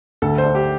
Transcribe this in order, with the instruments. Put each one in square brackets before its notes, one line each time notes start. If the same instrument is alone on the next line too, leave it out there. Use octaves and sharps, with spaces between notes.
[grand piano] D2 [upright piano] A4
[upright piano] C5
[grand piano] D4
[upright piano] G4